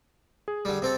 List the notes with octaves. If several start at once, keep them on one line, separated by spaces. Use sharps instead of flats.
G#4
D3 G3
C3 C4 A4